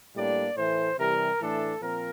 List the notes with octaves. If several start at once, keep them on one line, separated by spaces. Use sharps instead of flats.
A2 G3 A#3 D4 D5
A2 E3 A3 C5
C3 E3 G3 A#4
A2 E3 A3 D4 A4
A#2 F3 C4 A#4